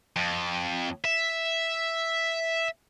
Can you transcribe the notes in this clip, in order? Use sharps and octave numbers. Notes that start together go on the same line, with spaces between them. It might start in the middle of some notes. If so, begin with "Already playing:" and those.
F2
E5